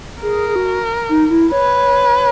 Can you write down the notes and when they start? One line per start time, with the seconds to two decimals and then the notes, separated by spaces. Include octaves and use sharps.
0.22 G#4 A#4
0.49 G#4
0.56 F#4
1.09 D#4
1.30 E4
1.52 B4 C#5